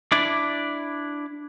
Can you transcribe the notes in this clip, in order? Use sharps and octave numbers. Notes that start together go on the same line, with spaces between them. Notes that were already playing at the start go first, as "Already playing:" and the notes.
D4 E4 D5